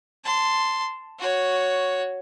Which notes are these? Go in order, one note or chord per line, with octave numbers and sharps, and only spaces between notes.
A5 C6
F#4 C#5